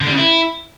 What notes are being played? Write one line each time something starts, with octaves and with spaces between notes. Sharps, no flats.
D3
G3
C#3
E4